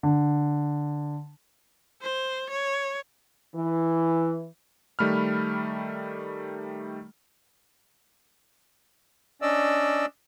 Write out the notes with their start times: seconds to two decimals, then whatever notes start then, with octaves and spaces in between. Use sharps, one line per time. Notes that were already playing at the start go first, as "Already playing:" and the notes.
0.03 D3
2.02 C5
2.50 C#5
3.54 E3
4.99 D#3 G3 A3 B5 F6
9.42 C#4 D4 D5 D#5 E6